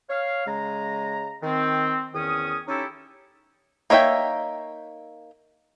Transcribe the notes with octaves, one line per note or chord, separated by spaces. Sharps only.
C#5 F5
C#3 G#3 A#5
D#3 C4
E2 D#3 C#4 D#6
C#4 D#4 E4 G4 A4
A#3 D#4 C#5 E5 G5